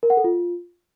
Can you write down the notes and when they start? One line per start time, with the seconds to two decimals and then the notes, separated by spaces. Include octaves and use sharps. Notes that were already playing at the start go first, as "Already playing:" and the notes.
0.03 A#4
0.10 F#5
0.17 A4
0.24 F4